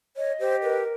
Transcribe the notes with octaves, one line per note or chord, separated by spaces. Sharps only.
C#5 D#5
G4 C5
A#4 B4